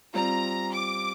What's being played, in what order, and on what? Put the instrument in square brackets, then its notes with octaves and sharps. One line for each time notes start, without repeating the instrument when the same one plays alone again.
[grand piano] G3 C4 F4 [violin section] A#5
[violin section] D6